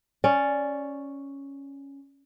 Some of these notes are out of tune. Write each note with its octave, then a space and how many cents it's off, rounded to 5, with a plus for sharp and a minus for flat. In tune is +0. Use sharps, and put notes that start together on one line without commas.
C#4 +0 D5 -5